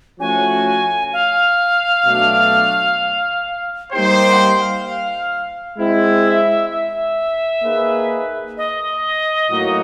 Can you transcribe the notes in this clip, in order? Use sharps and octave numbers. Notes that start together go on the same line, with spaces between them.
F3 A3 C#4 F#4 G#5
F5
B2 F#3 A3 D4
G3 A#3 D#4 G4 C5 G5
G5
F#5
G5
F5
F5
G#3 C4 E4
E5
E5
A#3 D#4 G#4 B4
D#5
A2 F#3 A#3 D#4 F#4